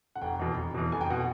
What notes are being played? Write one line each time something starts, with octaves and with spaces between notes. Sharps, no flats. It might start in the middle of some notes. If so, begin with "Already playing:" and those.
F#5
F1 G5
E2 B2
F1
E2 B2
F1 G#5
G5
B2 F#5